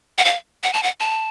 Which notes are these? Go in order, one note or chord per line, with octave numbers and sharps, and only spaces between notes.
F#5
F5
F#5
A5
F#5
A5